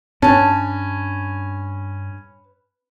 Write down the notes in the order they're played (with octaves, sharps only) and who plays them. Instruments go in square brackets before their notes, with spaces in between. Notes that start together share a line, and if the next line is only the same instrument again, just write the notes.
[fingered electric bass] G2 D4 [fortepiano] C#4 [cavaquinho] B4 A5